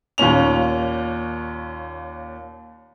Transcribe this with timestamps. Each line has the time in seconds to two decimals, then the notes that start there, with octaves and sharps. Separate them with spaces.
0.18 D#2 A#2 C#4 F7